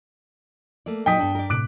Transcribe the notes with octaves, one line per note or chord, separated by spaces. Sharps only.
A3 A#3 D5
A#2 F#3 D#4 G5 D#6 B6
G2 B3 D4 A4
A#4 D5
A2 C3 D6 F#6 D7